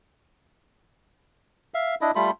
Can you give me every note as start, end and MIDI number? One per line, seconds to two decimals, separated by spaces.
1.74 1.95 76
1.74 1.95 77
2.01 2.11 62
2.01 2.11 64
2.01 2.11 75
2.15 2.31 55
2.15 2.31 57
2.15 2.31 65
2.15 2.31 83